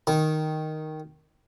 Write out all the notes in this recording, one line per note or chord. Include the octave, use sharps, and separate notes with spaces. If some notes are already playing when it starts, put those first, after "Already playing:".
D#3